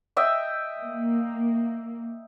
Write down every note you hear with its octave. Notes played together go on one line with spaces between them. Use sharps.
D#5 E5 G5
A#3